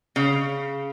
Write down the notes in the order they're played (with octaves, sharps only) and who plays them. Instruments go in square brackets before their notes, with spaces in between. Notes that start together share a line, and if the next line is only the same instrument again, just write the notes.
[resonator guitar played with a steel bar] C#3